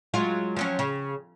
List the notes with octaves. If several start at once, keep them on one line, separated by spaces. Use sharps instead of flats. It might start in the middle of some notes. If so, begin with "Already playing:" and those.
F#3 G#3 F4
F3 F#3 C#4
C#3